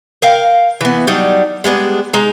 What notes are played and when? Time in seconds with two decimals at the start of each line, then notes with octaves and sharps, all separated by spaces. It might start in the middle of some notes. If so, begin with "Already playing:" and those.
0.22 A#4 F5 G5
0.81 E3 B3
1.07 F#3 G3 D4 D#4
1.64 G3 G#3 B3 D4
2.13 G#3 D#4 A#5